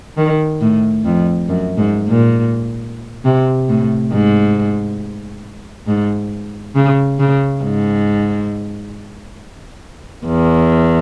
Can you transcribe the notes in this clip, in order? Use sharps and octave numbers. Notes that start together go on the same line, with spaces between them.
D#3
A2
F2
F#2
G#2
A#2
C3
A2
G#2
G#2
C#3
C#3
G#2
E2